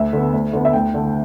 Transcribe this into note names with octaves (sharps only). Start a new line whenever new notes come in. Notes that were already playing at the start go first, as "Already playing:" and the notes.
Already playing: D2 E5
D3 B3
D2
D3 B3
E5
D2 G5
D3 A3